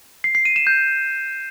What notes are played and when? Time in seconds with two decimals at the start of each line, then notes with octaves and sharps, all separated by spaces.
0.24 C7
0.35 C7
0.45 D#7
0.56 E7
0.67 G6